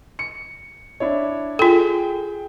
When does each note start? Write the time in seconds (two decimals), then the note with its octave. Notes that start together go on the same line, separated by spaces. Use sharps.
0.19 C#7
1.00 D4 E4 C#5
1.59 F4 G#4 A4 G5